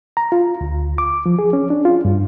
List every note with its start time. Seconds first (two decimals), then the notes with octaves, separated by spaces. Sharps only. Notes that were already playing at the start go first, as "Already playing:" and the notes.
0.17 A#5
0.32 F4
0.61 D2
0.98 D6
1.26 F3
1.39 G#4
1.53 C#4
1.70 D4
1.85 F4
2.05 G2